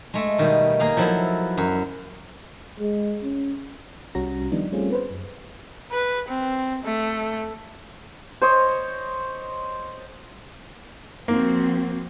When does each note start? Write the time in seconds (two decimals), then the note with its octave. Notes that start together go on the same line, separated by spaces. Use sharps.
0.14 G#3 A3 A4
0.38 B2 D#3 G3
0.80 A#3 G#4 F5
0.97 F3 F#3 E4 A4
1.57 F#2
2.79 G#3
3.23 C#4
4.15 C2 G3 C#4 F#4 A#5 A#6
4.52 D#3 F3 G3 B3 D4 D#4
4.72 G3 A3 C4 C#4 F4 G#4
4.90 B3 B4 C5
5.10 F#2
5.92 B4
6.29 C4
6.84 A3
8.42 C5 C#5 D#5
11.28 F3 A#3 C4 F#4